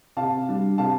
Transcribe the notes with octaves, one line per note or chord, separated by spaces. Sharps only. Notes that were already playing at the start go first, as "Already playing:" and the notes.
C3 F5 A5
G3 D4
C3 F5 A5